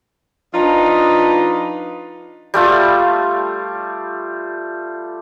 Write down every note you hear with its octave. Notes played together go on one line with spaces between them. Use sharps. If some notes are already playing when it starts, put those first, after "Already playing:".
F3 D4 D#4 F4 B4 D#5
G3 A3 F4